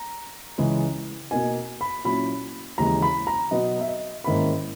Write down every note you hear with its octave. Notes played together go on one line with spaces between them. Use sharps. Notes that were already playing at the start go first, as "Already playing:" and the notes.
Already playing: A#5
C#2 C#3 E3 G#3 C#4
B2 A#3 D#4 G#5
B5
A#2 F#3 C#4 E4 B5
D#2 C#3 E3 G#3 A#5
B5
A#5
B2 F#3 B3 D#4 D#5
E5
D#5
G#2 D#3 A#3 C#4 E4 B5